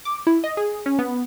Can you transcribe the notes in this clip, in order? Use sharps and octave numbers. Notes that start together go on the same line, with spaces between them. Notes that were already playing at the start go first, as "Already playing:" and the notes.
D6
E4
D#5
G#4
C#4
B3